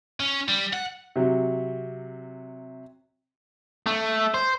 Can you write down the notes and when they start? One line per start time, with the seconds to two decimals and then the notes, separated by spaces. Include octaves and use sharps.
0.20 C#4
0.48 G3
0.73 F#5
1.16 C3 F#3
3.86 A3
4.34 C5